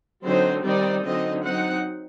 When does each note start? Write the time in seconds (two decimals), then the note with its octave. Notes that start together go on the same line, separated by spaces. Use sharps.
0.24 D3 F#3 C4 D#4 C5
0.64 D#3 G3 C4 D#4 D5
1.03 D3 F#3 C4 D#4 D#5
1.43 F#3 C4 D#4 F#5